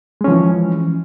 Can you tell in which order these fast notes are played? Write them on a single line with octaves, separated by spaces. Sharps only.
G#3 C#4 F3 E3